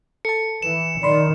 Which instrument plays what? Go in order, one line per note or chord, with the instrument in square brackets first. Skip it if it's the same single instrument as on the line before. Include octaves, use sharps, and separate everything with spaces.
[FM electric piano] A4 A5 [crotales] C#7
[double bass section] E3 [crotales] E7
[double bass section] D#3 [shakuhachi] D5 [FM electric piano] B5 C6